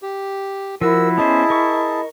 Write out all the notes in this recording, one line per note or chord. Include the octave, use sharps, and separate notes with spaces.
G4
F3 E4 F#4 A#4 E6
B3 C#4 G#4 C5 D#5 A5
A#4 C#6